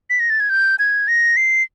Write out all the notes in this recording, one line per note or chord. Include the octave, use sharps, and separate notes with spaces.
B6
A#6
A6
G#6
G6
G#6
A#6
C7